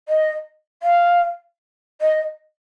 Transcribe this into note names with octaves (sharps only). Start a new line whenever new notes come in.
D#5
F5
D#5